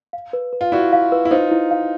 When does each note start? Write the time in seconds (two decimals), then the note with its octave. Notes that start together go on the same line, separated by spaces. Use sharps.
0.13 F5
0.33 B4
0.53 B4
0.61 F4
0.72 E4 F#4 D5
0.93 F5
1.12 B4
1.25 E4
1.31 D#4 F4 C5
1.51 E4
1.71 F5